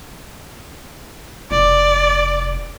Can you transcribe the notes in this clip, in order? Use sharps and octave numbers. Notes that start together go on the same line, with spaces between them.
F1 D5